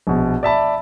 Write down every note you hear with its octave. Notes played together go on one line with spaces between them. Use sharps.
A#1 B2
D5 E5 A5 B5